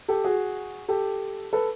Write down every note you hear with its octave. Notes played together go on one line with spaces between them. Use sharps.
G4 A4
F#4 G#4
G4 A4
A4 B4